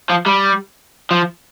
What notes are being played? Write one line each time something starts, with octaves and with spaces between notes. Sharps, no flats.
F3
G3
F3